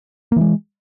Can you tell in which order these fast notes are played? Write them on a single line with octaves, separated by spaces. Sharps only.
A#3 E3 G#3